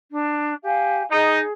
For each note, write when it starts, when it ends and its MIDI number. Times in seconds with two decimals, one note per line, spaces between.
0.12 0.54 62
0.63 1.02 67
0.63 1.02 77
0.63 1.02 80
1.10 1.40 63
1.10 1.52 68